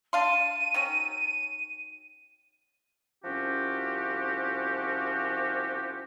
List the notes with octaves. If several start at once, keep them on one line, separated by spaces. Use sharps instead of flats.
D4 F5 C6 D#7
D#3 F#3 C#4
C2 F3 C#4 F#4 G4